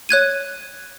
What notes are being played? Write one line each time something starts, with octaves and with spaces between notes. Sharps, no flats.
C#5 F#6 G#6 D#7